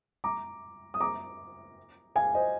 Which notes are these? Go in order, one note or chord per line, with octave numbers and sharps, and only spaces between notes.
A#5 D6
D#6
A#5 D6
F5 G#5
C5 D#5